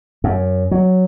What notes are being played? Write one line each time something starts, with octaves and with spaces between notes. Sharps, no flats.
F#2
F#3